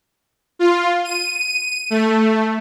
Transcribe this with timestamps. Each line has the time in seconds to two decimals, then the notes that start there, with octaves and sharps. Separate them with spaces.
0.59 F4
1.04 D#7
1.90 A3